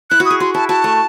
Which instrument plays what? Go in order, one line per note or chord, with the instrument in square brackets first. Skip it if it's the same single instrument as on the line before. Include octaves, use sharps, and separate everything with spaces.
[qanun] E4 [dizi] F#6
[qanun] F#4
[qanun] G#4 [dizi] D#6
[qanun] F#4 [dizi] C6
[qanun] E4 [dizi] A5
[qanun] F#4 [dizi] A5
[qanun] A3